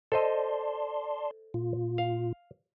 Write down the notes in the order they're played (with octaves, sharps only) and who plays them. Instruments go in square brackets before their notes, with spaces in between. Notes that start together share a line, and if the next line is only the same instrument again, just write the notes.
[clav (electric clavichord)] A4 C5 D#5 [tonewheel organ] D5 A5 C6
[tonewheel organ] A#2 F4
[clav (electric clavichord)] F5